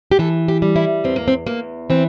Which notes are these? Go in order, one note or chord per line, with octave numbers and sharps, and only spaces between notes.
G4
E3 A4
G4
G3
E4
E2 C4
A#3
C4
E2 A#3
E3 C4